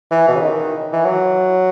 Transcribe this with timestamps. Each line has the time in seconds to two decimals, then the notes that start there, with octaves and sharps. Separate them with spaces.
0.11 E3
0.28 B2
0.35 C#3
0.42 D#3
0.93 E3
1.05 F#3